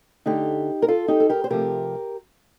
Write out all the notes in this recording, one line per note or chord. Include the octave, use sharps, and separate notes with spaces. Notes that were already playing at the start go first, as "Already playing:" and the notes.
D3 A3 D#4 G4
A#4
F4 A4
D#4 G4
A4
G4 A#4
C5
C3 F3 A3 G4 A#4